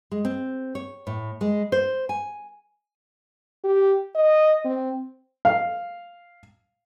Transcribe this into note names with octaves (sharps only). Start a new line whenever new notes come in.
G#3
C4
C#5
A2
G#3
C5
G#5
G4
D#5
C4
F5